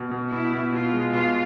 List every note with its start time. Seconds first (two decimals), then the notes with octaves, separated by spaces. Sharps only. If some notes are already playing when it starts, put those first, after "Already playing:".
Already playing: B2
0.11 B2
0.32 B2 E4
0.53 B2
0.73 B2 F4
0.93 G#3
1.14 B2 F4